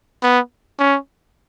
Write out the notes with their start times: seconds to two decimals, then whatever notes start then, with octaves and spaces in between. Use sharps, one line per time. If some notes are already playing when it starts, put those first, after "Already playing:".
0.23 B3
0.79 C#4